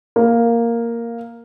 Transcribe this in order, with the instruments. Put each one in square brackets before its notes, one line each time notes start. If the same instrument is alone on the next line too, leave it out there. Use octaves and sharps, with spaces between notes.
[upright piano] A#3